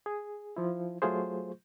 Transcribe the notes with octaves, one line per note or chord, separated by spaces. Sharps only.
G#4
F3 E4
F#3 A3 F4 G#4 C5